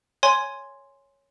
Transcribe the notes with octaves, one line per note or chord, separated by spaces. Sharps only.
C#5 G#5 C6